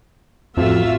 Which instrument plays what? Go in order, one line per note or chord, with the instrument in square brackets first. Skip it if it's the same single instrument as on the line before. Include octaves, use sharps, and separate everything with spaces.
[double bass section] A1 [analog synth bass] F2 [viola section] F4 F#4 E5